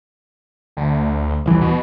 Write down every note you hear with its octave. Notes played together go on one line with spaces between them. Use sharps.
D2
D#1 C2 E3
B2